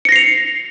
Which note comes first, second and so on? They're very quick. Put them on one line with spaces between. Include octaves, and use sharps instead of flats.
C#7 A#6 C7 F7